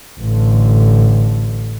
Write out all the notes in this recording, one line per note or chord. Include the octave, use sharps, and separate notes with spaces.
A1 D3